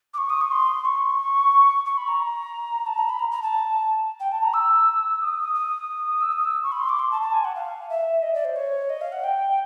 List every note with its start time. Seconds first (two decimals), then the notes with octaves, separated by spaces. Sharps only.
0.14 D6
0.18 C#6
0.29 D#6
0.41 C#6
0.51 C6
0.85 C#6
1.85 C#6
1.97 B5
2.08 A#5
2.86 A5
2.98 A#5
3.09 B5
3.19 A#5
3.31 A#5
3.42 A5
4.20 G5
4.32 A5
4.42 A#5
4.53 E6
5.21 D#6
5.54 D#6
6.21 E6
6.32 D#6
6.44 E6
6.63 C#6
6.72 B5
6.79 C6
6.89 D6
6.99 C6
7.11 A5
7.22 A5
7.33 G#5
7.44 F#5
7.55 F5
7.89 E5
8.22 D#5
8.34 D5
8.45 C5
8.56 C#5
8.89 D#5
9.01 F5
9.12 F#5
9.24 G5